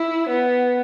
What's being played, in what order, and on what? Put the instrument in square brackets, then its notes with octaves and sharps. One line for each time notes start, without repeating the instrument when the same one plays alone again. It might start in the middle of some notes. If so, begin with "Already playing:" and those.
Already playing: [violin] E4
B3